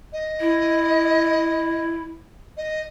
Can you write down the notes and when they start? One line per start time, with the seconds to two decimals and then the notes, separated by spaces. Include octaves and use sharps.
0.12 D#5
0.40 E4
2.57 D#5